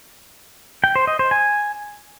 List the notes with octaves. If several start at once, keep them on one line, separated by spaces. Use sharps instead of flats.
G5
C5
D#5
C5
G#5